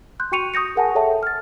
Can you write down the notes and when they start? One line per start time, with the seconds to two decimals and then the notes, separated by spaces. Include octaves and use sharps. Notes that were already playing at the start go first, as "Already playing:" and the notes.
0.20 C6 F#6 G6
0.32 F#4 G5 C#6 C#7 D#7 F7
0.54 C#6 D#6 G6 A#6 C#7
0.76 G#4 A#4 F#5 G#5 A5
0.95 G#4 A4 C#5 E5 G5 A5
1.23 F6 A6